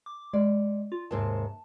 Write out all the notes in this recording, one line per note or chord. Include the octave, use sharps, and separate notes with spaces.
D6
G#3 D5
F4
D#2 G#2 C3 A5